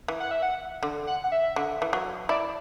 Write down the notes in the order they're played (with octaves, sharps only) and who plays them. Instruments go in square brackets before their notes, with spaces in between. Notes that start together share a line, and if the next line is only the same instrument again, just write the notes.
[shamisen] E3
[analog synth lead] F#5
E5
F#5
[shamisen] D3
[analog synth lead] F#5
F#5
E5
[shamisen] D3
E3
F#3
[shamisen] E4 [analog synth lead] D5